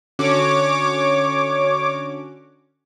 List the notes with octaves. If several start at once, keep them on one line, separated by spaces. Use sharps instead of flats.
D3 C#4 F#4 C#5 D6